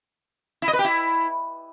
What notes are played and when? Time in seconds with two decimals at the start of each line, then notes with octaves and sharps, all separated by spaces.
0.62 E4
0.68 D#5
0.73 B4
0.79 G4
0.84 E4